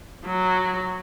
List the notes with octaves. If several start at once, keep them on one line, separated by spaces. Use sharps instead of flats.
F#3